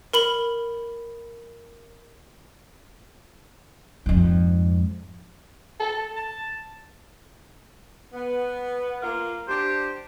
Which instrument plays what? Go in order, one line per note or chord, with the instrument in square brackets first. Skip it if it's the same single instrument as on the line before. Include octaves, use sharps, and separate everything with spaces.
[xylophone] A#4 B5 F#7
[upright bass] F2 G#2
[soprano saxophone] A4
A5
[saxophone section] B3
A#3 F4 A#4
[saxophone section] D4 G4 [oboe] C5